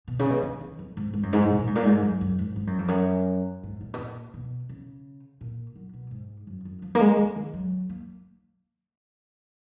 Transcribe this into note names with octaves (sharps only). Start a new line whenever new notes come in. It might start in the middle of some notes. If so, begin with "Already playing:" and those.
B2
C#3
B2
C#3
D#3
F2
G#2
G#2
F#2
G#2
B2
A#2
G#2
A#2
G#2
F#2
F#2
G#2
G#2
F#2
F2
F#2
G#2
A#2
B2
A#2
B2
C#3
A#2
F#2
B2
G#2
F#2
F#2
F3
A#3
G#3
A#3
D#3
F#3
A#3